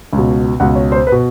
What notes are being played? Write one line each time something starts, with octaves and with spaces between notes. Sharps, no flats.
C#2
B2
C#2 B2 F#5
C#5
C5
B4
B2